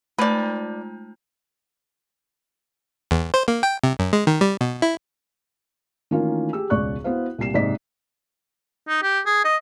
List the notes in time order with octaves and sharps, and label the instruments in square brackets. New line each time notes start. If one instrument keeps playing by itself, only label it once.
[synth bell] G#3 D#4 F4 [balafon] A3 [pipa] B4 D5
[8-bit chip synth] E2
C5
A#3
G5
C3
F#2
G#3
D#3
G3
B2
E4
[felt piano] D#3 E3 A3 A#3 C#4 F4
G4 G#4 E6
E1 C#2 D5 C#6 F#6
B3 E4 F#4 C5 F5
C2 A#2 G4 C7 E7
F#1 G#2 C3 D5 D#5 B6
[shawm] D#4
G4
G#4
D#5